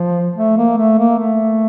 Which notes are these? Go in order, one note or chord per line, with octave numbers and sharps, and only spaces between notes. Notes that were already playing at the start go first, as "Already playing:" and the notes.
Already playing: F3
A3
A#3
A3
A#3
A3